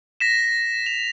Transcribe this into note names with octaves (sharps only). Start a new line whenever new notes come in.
A#6 B6 E7
F7